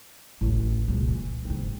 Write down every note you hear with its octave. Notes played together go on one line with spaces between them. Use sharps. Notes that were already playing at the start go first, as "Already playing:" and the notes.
A1 D2
C#2 A#2
E3
G#2 C4